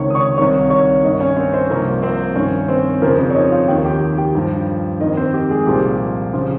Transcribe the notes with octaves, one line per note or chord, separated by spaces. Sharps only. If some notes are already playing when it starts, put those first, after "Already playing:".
Already playing: C#2 C3 D#3 C#5 C#6
D#6
C#5 C#6
C2 C3 D#3 C#5 C#6
C#5 C#6
G2 D#3 D#4 D#5
C#4 C#5
C4 C5
C4 C5
C2 C3 F3 A#3 A#4
C4 C5
G2 D#3 C#4 C#5
C4 C5
F2 C#3 F3 A#3 A#4
C4 C5
C#5
D#4 D#5
F4 F5
D#2 D#3 G4 G5
G4 G5
G4 G5
G2 F3
F2 D#3 D#4 D#5
C4 C5
G4
G#3 G#4
C2 A#2 F3 G4
C#3 F3 F4